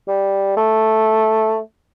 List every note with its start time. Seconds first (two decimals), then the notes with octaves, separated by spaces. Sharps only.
0.08 G3
0.57 A3